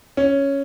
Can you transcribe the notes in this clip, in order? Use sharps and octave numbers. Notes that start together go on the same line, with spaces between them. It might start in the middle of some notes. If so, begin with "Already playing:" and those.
C#4